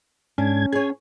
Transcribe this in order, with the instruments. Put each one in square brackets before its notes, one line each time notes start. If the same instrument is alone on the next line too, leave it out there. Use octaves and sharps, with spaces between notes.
[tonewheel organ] G#2 G#6 [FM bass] C#4 [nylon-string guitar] D4
[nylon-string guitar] G#4 C#5 [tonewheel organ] G#5